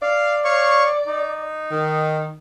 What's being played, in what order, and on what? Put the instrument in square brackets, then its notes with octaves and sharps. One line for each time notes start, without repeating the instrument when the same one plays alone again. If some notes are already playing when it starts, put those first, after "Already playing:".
[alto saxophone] D5 [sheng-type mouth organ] F5
[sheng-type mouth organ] C#5 F5 C#6
D#4
[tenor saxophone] D#3